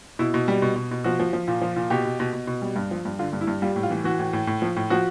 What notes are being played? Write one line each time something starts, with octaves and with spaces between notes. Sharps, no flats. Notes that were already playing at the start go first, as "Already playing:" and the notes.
B2 E4
B2
G3
B2
B2
B2
F3 F#4
F3
F3
A#2
F3
A#2
B2 G4
B2
B2
B2
B2
G3
G2
F3
G2
D3 F4
G2
E4
G2
G3 F4
A2
F4
E3
E3 F#4
A2
A2
A2
F3
A2
F3 F#4